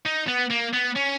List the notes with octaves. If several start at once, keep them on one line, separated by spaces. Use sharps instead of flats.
D#4
B3
A#3
B3
C#4